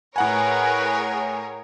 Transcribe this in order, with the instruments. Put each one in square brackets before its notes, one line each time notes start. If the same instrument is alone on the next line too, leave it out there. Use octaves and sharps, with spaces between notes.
[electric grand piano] A2 F#5 G#5 [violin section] G#4 A#4 C#5 [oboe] B4